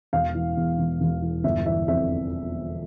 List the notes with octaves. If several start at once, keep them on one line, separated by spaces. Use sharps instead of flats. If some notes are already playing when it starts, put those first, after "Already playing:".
E1 F5
E3
E2
E1
E1
E3
G1 E5
E3 E5
F2 E5